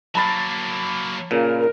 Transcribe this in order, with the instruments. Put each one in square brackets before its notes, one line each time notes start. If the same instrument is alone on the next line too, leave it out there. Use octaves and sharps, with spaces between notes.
[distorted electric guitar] F#3 A#3 [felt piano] A5 B5 A6
[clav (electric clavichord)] A#2 C#3 [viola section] A#4